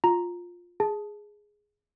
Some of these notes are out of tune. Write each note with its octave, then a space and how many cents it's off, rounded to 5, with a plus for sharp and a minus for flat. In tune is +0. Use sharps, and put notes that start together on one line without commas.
F4 +10 A#5 +0
G#4 +0 A5 -15